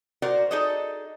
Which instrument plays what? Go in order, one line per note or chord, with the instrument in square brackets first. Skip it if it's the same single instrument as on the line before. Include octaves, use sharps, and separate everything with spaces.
[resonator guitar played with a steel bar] F#4 A#4 C5 D5
D#4 G#4 A4 D5 D#5